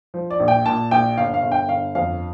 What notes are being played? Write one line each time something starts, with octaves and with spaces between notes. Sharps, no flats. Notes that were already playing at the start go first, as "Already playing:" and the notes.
F3
D5
A#1
G5
A#2 A5
A#1 G5
G1 F5
F5
G1
G5
G1 F5
F2 F5